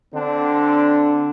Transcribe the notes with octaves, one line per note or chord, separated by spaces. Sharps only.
D3 C4 D4